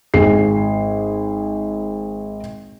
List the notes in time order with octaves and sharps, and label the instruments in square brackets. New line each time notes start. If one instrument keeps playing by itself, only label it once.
[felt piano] G#1 G#4 C7